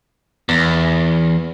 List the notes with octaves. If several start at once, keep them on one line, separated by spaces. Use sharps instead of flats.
E2